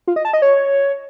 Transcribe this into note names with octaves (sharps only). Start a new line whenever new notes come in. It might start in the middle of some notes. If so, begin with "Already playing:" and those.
F4
D#5
A5
D#5
C#5